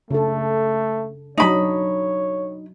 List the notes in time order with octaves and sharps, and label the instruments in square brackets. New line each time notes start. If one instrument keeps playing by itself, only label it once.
[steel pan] C#3 D4 A4 [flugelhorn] A3
[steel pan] F#3 D4 [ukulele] D#4 B5 [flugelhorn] C#5